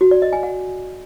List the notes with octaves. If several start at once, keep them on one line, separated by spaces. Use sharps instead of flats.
F#4
D5
D#5
G#5
F#5